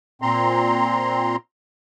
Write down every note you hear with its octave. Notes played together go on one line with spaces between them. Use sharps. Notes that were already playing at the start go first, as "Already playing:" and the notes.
A#2 C4 A#5 C6